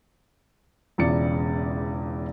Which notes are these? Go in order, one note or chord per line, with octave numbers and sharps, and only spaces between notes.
E1 E2 C#3 F4 D5 C#7